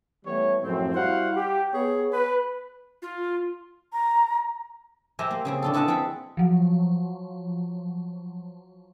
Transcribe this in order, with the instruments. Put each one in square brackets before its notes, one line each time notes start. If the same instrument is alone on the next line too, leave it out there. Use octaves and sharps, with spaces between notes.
[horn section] E3 G3 A3 B3 C#5
F#2 A2 F3 C4
G3 E4 F#4 C5 F5 F#5
G4
B3 G#4 C#5
B4
[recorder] F4
[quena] A#5
[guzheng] G4 A#4 C5 E5 G#5 A#5
A#3
C#3 C4 G#4
D3 F4 A4
E4 A4 B4 D#5 F#5 A5
C4 G#4 A4 F#5 B5
[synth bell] F3 F#3